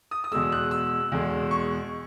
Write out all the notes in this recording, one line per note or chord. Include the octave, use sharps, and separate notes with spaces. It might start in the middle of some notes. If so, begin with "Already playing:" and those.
D#6
D#6
E2 B2 G#3 E6
F#6
E6
E2 B2 G#3
C#6